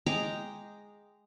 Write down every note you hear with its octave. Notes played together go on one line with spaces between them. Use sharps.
G#3 G5 A#5 D6